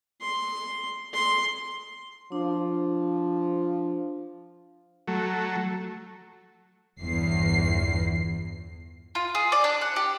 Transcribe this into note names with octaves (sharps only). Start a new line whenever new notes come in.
C6
C6
F3 D4
F#3 A3
G1 E2 C7
F4
G#4
D5
D4
F#5
G4